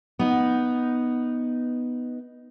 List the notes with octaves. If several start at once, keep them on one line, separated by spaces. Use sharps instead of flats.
B3 D#4